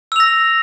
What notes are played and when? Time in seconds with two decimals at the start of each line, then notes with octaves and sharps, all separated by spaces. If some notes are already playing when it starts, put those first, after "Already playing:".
0.12 E6
0.16 F7
0.20 A#6